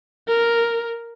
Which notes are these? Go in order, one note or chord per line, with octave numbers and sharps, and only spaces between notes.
A#4